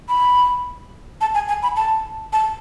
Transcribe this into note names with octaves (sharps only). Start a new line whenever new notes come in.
B5
A5
G#5
G#5
B5
A5
A5